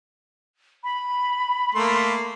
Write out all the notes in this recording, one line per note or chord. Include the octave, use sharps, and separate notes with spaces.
B5
A3 A#3 B5 C6